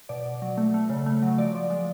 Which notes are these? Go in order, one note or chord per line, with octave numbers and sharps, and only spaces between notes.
B2 D5
B2
F#3
A3
A3
C#3
A3
F#3
F3 D5
F3
G#3